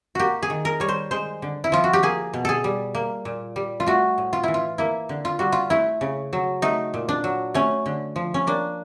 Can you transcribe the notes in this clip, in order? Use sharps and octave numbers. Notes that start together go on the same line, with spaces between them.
A#3 F#4 G4
G#4
D#3
A#4
G3 C#5
C5
G#3 C5
D3
E4
F3 F4
F#4
G4
A#3 G#4
B2
G#4 A4
G3
A#3
A#2
G3
F4
A3 F#4
A2
F4
E3 E4
F4
A#3 E4
D3
F4
G3 F#4
F4
A3 E4
C#3
F#3
A3 D#4
A#2
D4
F#3
A3 C#4
D3
F3
C#4
A#3 D4